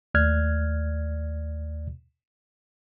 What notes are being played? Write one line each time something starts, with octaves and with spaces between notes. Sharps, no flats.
D#2 A3 D5 F6 F#6 G#6